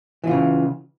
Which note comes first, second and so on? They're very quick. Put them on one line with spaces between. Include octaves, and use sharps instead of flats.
E3 F4 C#3